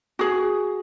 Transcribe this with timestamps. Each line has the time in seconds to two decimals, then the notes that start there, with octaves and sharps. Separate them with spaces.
0.19 F#4 G#4